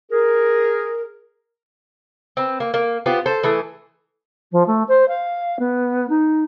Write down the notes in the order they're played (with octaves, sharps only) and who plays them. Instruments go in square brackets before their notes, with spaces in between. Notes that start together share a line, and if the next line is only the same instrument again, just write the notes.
[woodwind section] G#4 A#4
[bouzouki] C4 B4
A#3
A#3
B3 F4 G4 C5
A4 C5
E3 A3 G#4
[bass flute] F3
A3
C5
F5
B3
D#4